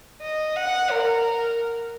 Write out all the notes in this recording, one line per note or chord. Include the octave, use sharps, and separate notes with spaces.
D#5
F#5
A#4